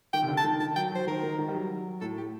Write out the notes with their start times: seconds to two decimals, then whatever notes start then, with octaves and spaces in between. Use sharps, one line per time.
0.13 D#3 G5
0.22 C3
0.28 D3
0.37 A5
0.44 D#3
0.60 D#3 A5
0.76 F#3 G5
0.91 F#3 C5
1.07 D#3 A#4
1.23 D#3
1.39 D#3
1.48 G3
1.54 F#3
2.01 A2 A4
2.17 G4